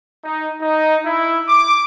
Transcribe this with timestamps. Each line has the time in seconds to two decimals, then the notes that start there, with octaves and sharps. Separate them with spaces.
0.23 D#4
0.60 D#4
1.06 E4
1.46 D6